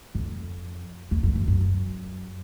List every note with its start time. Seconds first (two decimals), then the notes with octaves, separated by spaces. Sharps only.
0.15 F2
1.11 E2
1.23 F2
1.35 F#2
1.48 F#2